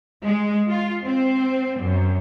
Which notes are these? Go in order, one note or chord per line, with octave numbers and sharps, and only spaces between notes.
G#3
F4
C4
F#2